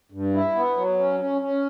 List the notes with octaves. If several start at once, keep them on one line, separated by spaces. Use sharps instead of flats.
G2
E4
B3
F#3
C#4
C#4
C#4